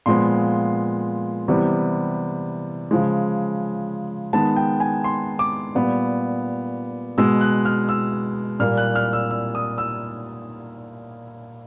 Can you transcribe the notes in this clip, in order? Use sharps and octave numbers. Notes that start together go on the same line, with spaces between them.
A#2 F3 G#3 B3 C6
C3 E3 G3 B3
C#3 F3 G#3
D#3 G#3 B3 A5
G5
G#5
C6
D6
A#2 G3 B3
B2 G#3 B3 E6
F#6
F6
E6
A#2 G3 A#3 F6
F#6
F6
E6
E6
D#6
E6